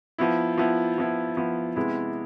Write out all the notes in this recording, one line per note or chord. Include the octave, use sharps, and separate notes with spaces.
F3 B3 E4
F3 B3 E4
F3 B3 E4
F3 B3 E4
C3 G#3 B3 E4